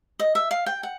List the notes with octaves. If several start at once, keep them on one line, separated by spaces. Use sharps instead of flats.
D#5
E5
F5
G5
F#5